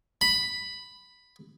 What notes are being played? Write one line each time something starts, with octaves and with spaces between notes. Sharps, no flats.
B5